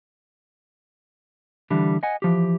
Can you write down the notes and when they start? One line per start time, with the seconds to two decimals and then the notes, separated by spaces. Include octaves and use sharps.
1.71 D3 E3 G3
2.03 D#5 F#5 G#5
2.22 E3 F3 G4